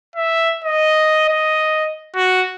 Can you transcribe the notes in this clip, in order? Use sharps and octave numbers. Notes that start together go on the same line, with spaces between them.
E5
D#5
D#5
F#4